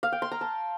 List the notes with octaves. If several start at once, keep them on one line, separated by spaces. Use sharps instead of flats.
F5
G5
C6
A#5
A5